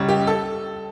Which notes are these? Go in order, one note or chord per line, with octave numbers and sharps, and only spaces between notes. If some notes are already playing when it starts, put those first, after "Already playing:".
Already playing: C#2 C#3 G3 C#5
G4
A4